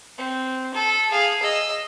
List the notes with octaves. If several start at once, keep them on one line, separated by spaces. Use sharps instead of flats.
C4
A4
G#4 F5
D#5 E6